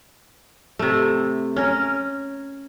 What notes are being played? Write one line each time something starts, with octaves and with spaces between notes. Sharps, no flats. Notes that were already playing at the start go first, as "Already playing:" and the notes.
C3 A3
C#4 A#4